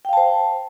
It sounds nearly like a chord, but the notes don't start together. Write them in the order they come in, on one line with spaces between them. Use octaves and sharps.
G5 F5 A5 C5